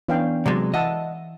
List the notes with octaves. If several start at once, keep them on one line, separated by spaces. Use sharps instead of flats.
E3 B3 C#4 D4 F5 G5
C3 F#3 G#3 D5
E3 D#5 E5 F#5 A5